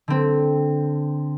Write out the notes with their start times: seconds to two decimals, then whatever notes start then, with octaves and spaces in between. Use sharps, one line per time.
0.08 D3 C4